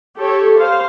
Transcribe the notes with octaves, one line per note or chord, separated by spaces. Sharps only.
G4 A4 C#5
C5 F5